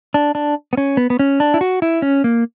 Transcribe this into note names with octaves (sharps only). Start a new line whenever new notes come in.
D4
D4
B3
C#4
B3
B3
C#4
D4
E4
F#4
E4
C#4
A#3